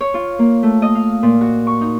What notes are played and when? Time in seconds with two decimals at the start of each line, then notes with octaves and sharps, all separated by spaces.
0.01 C#5
0.14 F4
0.39 A#3
0.63 A3
0.82 D#5
0.95 F5
1.23 A#2
1.41 F#4
1.67 C#6
1.81 D#4